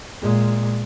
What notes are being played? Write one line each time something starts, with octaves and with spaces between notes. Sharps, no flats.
A#2 G#3